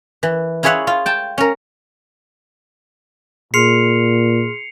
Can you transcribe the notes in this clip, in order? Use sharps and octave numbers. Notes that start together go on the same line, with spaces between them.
E3
E4 F4 G#4 C#5 E5 F#5
F4
G5 A5
C#4 A#4
A#2 G#4 C6 F6 C7 C#7 F7